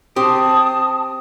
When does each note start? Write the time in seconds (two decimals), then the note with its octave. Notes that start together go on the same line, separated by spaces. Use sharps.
0.16 C4 G4 A5 D#6